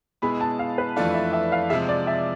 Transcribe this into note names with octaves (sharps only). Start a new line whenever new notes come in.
B2 G#3 B3 E4 G#4 B5
A5
F5
B4
F2 E3 A3 D4 F4 D5
E5
E5
F5
C3 F3 G#3 E5
D5
E5